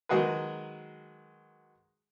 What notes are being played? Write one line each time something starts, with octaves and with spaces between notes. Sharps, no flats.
D#3 F#3 G#3 F#4 G#4 B4